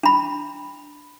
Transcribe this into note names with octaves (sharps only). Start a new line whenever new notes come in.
D4 B5